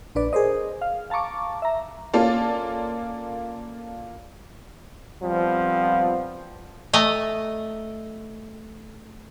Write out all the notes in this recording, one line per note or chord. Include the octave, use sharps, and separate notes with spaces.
A#1 D4 B4 D5
G#4 A#4 C5 D#5
F5
F5 A5 A#5 C#6 D6
E5 A#5
A#3 C#4 F4 A4 D5 F5
F3 G3 B3 C4 F4
A3 D#5 A#5